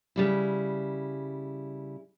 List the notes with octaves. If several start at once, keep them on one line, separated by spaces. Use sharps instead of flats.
C#3 G3 E4